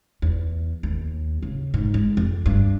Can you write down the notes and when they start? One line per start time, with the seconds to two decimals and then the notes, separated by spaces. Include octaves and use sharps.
0.22 E2
0.83 D#2
1.42 C#3
1.74 G#2
1.94 G#3
2.17 F2
2.46 G2